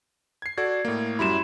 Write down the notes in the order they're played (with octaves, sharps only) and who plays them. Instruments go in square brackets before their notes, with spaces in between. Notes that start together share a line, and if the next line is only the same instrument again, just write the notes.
[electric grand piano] G#6 C7
[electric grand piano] F#4 A4 D5 [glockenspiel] G#6
[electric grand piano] A2 A#3
[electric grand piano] F#2 G3 E4 [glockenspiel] B5 C6 E7